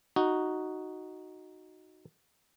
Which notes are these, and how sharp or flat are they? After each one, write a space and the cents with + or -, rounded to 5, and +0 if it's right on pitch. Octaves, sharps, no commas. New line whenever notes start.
D#4 +0 F#4 +0